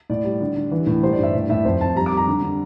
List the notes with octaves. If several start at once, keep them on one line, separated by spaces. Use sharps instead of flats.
A2 D5
G3
D3
D3
E3
A2
G3 C5
D5
G2
E5
A2 D5
A2 E5
F2 C5
F2 A5
G3 A#5
D6
G3
A#5
D3
D3